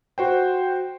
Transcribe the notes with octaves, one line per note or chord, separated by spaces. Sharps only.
F#4 C5 G5